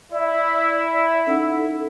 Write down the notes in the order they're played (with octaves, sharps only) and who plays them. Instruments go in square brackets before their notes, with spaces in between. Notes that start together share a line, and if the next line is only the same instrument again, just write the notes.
[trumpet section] E4 [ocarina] D5
[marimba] C#4 D#4 F#5 [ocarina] A4